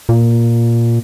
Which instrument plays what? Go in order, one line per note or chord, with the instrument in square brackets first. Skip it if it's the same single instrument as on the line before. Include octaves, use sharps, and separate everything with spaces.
[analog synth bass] A#2